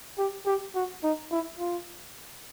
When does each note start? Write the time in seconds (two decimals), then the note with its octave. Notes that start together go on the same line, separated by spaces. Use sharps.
0.18 G4
0.46 G4
0.75 F#4
1.03 D#4
1.31 E4
1.59 F4